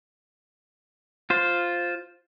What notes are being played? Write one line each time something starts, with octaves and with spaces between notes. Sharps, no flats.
F4 C5